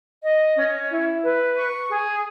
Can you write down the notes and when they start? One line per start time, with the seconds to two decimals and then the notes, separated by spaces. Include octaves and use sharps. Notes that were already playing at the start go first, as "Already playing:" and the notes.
0.23 D#5
0.56 C#4
0.90 E4
1.23 B4
1.56 C#6
1.90 G#4